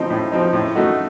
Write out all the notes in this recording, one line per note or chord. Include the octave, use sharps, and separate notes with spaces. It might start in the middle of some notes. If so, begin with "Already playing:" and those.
Already playing: A2 F3 C4 D#4
A2
F3 C4 D#4
A2
A3 D#4 F#4